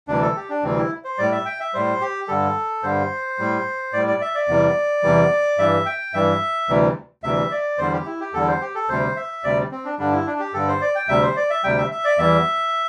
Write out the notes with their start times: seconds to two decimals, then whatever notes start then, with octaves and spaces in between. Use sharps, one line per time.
0.08 D2 C3 E3 G3 D4
0.22 A4
0.36 G4
0.50 D4
0.63 D2 C3 E3 G3 C4
0.77 E4
1.04 C5
1.18 A2 G3 D5
1.32 E5
1.45 G5
1.60 E5
1.74 A2 G3 C5
2.01 G4
2.28 G2 D3 G3 A4
2.83 G2 D3 G3 C5
3.39 A2 G3
3.93 A2 G3 D5
4.07 D5
4.21 E5
4.35 D5
4.48 E2 C3 E3 G3
5.03 E2 C3 E3 G3
5.58 G2 E3 G3 E5
5.86 G5
6.14 G2 E3 G3 E5
6.69 D2 C3 E3 G3
7.23 D2 C3 E3 G3 E5
7.51 D5
7.78 E2 D3 G3 C5
7.92 G4
8.06 E4
8.20 G4
8.34 E2 D3 G3 A4
8.48 C5
8.61 G4
8.75 A4
8.89 D2 C3 G3 C5
9.16 E5
9.44 D2 C3 G3 D5
9.72 C4
9.85 D4
9.98 G2 D3 G3 D4
10.12 E4
10.27 D4
10.40 G4
10.54 G2 D3 G3 A4
10.68 C5
10.81 D5
10.95 G5
11.08 D2 C3 G3 E5
11.22 C5
11.36 D5
11.50 E5
11.64 D2 C3 G3 G5
11.78 E5
11.91 E5
12.04 D5
12.18 E2 E3 G3 E5